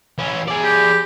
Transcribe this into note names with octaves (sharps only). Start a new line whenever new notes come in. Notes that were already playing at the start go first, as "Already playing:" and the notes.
E3 C#4
G#4 D5
G4